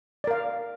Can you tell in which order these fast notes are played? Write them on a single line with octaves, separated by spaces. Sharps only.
D5 A#4 F5